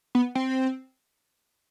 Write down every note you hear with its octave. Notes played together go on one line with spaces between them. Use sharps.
B3
C4